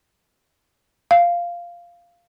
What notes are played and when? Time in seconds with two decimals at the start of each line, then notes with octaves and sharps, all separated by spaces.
1.11 F5